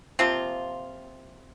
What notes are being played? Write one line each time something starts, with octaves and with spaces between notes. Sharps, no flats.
C3 F3 A#3 C4 F4